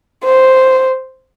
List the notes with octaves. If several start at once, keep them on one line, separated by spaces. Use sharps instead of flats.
C5